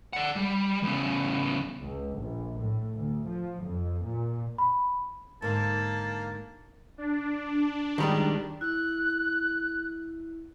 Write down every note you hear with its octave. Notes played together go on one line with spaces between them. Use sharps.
D5 F#5
G3
E2 C#3
C#2
A#1
A2
D2
F3
F2
A#2
B5
G#2 D3 A#3 A5
D4
D#3 G3 G#3
E4 F#6